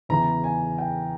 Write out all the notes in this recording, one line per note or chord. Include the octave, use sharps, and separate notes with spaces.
E2 C#3 E3 A#5
G#5
G5